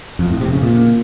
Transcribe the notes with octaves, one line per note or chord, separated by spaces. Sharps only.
F2
A2
C3
C#3
A#2